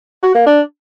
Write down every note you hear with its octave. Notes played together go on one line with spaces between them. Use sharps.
F#4
A#3
D4